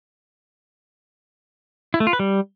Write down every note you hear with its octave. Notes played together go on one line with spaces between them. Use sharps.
E4
A3
F4
B4
G3